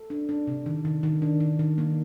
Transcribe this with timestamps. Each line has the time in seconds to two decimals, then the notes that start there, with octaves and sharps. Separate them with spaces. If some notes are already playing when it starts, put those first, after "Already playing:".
Already playing: A4
0.10 D4
0.29 D4
0.47 C3
0.66 D#3
0.85 D#3
1.03 D#3
1.22 D4
1.40 D#3
1.59 D#3
1.78 A#3